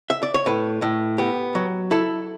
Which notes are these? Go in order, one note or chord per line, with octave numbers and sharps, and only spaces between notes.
E5
D5
C#5
A2 B4
A2
B3 G4
F#3
E4 A4